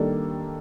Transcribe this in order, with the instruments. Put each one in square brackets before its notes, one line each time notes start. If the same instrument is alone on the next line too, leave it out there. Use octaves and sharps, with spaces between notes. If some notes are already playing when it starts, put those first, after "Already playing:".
Already playing: [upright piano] D#3 G3 A#3 D4 A4